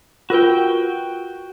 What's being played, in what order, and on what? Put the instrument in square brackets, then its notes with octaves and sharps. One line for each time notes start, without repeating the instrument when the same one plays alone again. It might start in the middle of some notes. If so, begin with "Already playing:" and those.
[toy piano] F4 A#4 B4 [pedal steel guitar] F#4 G5